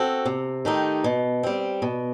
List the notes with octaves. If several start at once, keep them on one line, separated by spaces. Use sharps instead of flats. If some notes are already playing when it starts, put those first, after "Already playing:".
Already playing: C4 F#4 A4
C3
D#3 A3 D#4 G4
B2
G3 C4
B2